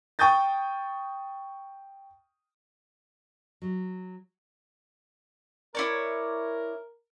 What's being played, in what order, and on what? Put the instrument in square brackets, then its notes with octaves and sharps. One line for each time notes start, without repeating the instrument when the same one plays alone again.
[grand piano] G5 C#6 D#6 G6 A6
[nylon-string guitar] F#3
[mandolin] E4 C#5 D5 [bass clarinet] A#4